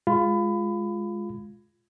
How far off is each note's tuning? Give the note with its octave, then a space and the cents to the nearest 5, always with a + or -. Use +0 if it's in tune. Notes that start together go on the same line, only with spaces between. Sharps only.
G#3 +0 F4 +0 B5 +25